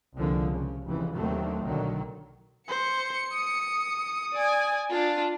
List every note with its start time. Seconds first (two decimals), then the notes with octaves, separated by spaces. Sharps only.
0.16 C2 D3 F3 G#3 A#3
0.52 C#3
0.85 F1 F2 C#3 E3
1.15 D#2 D3 D#3 F#3 A3 C4
1.64 B1 D3 D#3 F#3
2.69 C5 C#7
3.33 D#6
4.34 D5 G#5
4.90 D4 F4